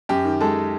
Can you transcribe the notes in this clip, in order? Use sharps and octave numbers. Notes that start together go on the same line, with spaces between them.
F#2 G4
D#3
G#3 A4